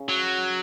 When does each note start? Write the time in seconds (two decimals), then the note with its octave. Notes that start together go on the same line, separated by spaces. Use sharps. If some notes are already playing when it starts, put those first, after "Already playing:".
Already playing: C#3
0.09 F#3